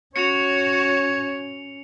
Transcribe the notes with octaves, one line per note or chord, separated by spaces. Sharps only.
C#4 F#4 C#5 C#7 F7